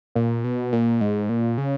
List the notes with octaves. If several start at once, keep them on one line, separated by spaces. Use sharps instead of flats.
A#2
B2
A#2
G#2
A#2
C#3